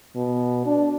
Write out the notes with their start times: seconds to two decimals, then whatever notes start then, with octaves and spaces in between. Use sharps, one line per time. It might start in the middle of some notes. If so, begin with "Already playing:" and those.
0.16 B2
0.66 D4